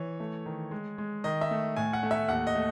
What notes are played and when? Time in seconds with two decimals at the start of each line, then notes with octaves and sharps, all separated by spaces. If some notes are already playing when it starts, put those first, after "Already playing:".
Already playing: E3 C#5
0.20 A3
0.46 D#3
0.71 G#3
0.98 G#3
1.24 D#3 D#5
1.41 E5
1.51 A3
1.76 A2 G#5
1.93 F#5
2.03 A3
2.11 E5
2.29 D#2 F#5
2.47 D#5
2.55 A3